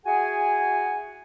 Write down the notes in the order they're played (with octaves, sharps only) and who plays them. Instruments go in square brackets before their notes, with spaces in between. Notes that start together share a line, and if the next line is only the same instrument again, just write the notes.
[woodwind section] E4 F#4 G#4 F#5 G#5